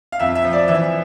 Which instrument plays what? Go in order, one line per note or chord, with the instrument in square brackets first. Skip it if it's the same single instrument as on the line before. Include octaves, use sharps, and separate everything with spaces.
[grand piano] F5
F2 E5
E5
F3
D5
E3 E5